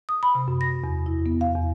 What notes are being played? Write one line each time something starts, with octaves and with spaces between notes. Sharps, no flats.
D#6
B5
C3
F#2
A#6
E2
E4
B3
F5
E2